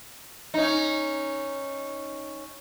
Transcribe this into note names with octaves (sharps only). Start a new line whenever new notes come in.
C#4 D#4